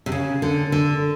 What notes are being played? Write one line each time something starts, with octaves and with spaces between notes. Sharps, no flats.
C3
C#3
D3
D3